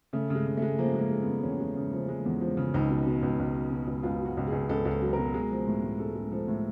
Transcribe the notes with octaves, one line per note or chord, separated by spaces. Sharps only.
C#3 A3
C#3 G#3
C#3
G#3 A3
F3 A#3
G#3 A#3
G#3
B3
C#3
E2 C#4
G#3
C#3
F3
G#3
E2
F3
C#3
C#2 D#4
B2
B2
C#2
C#2
F#3
B2
C#2
C#2 F4
F#3 F#4
C#2
G#4
C#2
C#2 A4
C#2
A4
F#3
A#4
B2
G#3
F3
A2
A2
G#3 A4
G#3
F3 A4
A2